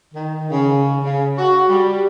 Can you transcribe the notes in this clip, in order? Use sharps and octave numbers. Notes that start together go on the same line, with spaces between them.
D#3
C#3
C#3
F#4
G3